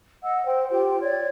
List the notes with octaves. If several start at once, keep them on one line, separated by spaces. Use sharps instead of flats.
D#5 F#5 E6
C5 G5
F4 G4 C5 G5
C#5 D5 G#6